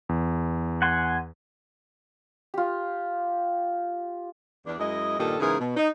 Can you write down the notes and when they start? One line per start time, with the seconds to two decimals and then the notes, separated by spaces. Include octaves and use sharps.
0.09 E2
0.82 F#5 G#5 C6
2.54 F4 G4
4.66 E2 D4
4.79 F#2 G#3 E4 D#5
5.19 G2 A#2 D#3 G3 A4 D#5
5.40 G#2 C#3 E3 B3 G#4 A#4
5.59 B2
5.77 D#4